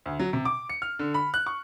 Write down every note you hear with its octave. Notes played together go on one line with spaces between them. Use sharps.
D2
F#3
C3
D6
C#7
F6
D3
B5
F#6
C#6